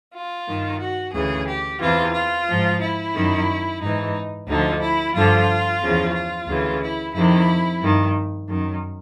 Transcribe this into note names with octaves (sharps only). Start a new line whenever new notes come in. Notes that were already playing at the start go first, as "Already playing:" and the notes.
F4
G2 D#3
F#4
D2 C#3 E3 G#4
G4
E2 C3 E3 F4
F4
G#2 F3
E4
F#2 D#3
G#2 E3 D#4
D2 D3 F3 D#4
E4
G2 D3 F3 F4
E2 C#3 F3
F4
D2 C#3 E3
E4
F2 C3 D#3 E4
G2 D#3
F#2 D#3